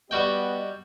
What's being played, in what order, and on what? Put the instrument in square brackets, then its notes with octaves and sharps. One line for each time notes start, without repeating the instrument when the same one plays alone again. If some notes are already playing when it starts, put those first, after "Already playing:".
[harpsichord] G3 F#4 G5 [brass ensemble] B3 G4 D#5